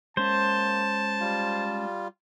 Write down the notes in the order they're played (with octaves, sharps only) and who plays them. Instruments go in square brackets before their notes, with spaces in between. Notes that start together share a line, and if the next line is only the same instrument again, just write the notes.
[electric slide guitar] G#3 C#4 [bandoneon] A#3 [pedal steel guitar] C5 [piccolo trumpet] A5
[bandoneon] G3 F4